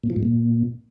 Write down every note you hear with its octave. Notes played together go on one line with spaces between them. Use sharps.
A#2
F3
G#2
A#2